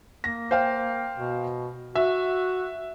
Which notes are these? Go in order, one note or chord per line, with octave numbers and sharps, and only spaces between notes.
A#3 A#6
C5 F5 G5
B2
F#4 E5